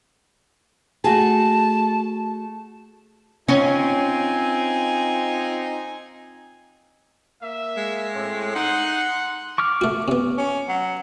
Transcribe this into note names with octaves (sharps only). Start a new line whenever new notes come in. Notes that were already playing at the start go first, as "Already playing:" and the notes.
A3 F#4 G#4 A5
C4 C#4 D#4 F4 G#5
A#3 E5
G#3
A2 C4
D#4 F#5 C6
C#6 D6 F6
A3 F#4
C3 B3
C#4
F#3